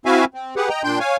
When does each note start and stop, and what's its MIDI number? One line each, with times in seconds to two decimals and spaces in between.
0.06 0.25 60
0.06 0.25 64
0.06 0.25 66
0.06 0.25 76
0.06 0.25 77
0.06 0.25 80
0.34 0.55 60
0.56 0.69 67
0.56 0.69 68
0.56 0.69 71
0.56 0.69 78
0.69 0.82 75
0.69 0.82 79
0.69 0.82 82
0.84 0.99 46
0.84 0.99 62
0.84 0.99 79
0.84 0.99 84
0.84 0.99 91
1.00 1.17 73
1.00 1.17 77
1.00 1.17 80